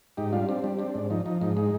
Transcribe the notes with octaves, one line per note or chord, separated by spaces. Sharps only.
G#2 D#4 G4
G3 D4 F4
C4 D4
G3 D4
C4 D4
G#2
F3 D#4
F3 D#4
G#2 D#4
G#3 D#4